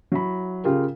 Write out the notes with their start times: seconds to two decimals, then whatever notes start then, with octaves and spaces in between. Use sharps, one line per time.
0.12 F#3 E4 B5
0.64 C#3 F4 G4 A#4